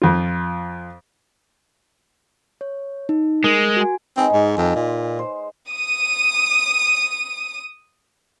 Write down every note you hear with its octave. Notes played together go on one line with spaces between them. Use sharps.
F2 F4
C#5
D#4
G#3 A#4
F#4 G#5
G#3 C4 D#4 B4
G#2
F2
A#2
C5
D#6 D#7